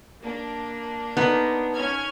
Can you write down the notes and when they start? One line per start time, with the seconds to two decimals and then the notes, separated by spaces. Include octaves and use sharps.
0.21 A#3 D4
1.17 B3 D#4 A#4 C6
1.73 C#4 F6 G#6